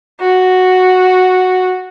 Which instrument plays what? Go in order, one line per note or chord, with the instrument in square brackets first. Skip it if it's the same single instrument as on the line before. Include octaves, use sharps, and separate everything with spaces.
[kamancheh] F#4